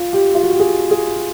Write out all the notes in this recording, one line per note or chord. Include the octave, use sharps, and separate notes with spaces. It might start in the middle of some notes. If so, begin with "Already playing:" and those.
Already playing: F4
G4
F4
F#4
G4
G#4
G#4